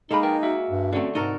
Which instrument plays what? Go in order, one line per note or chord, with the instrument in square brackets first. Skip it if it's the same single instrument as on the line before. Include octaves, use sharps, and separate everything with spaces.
[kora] G#3 A#3 [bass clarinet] D#4 [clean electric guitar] A4 B5
[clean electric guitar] A#4 B4 G5
F#4 E5
[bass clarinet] G2
[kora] D3 A3 [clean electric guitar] C4 C#4 F#4
[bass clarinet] G#2 [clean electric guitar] C3 D#4 [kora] F#4 A4 A#4